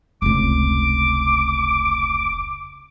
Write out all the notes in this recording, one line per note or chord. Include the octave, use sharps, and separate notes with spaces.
F1 C#2 D6